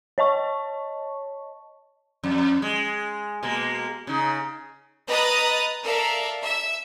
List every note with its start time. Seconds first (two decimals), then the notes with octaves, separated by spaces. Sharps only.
0.18 C#5 D#5 A5 C#6
2.23 F2
2.62 G#3
3.43 B2 G#3 A#3
4.07 C#3 D#4
5.08 B4 D#5 A#5 D#6 F#6 A6
5.82 A4 A#4 D5 E5 F5
6.42 E5